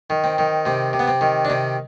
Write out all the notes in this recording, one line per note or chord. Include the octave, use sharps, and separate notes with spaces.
D#3
C4
D#3
C3 C4
C3
B3
C4
D#3
D4
C3 C4